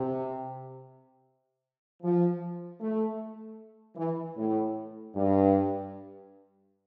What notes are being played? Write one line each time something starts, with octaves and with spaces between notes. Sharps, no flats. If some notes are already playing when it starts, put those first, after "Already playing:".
Already playing: C3
F3
A3
E3
A2
G2